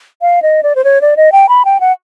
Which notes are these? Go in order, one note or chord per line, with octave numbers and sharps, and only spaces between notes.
F5
D#5
D5
C5
C#5
D5
D#5
G5
B5
G5
F#5